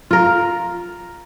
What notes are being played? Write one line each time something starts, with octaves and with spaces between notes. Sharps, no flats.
F4 A#4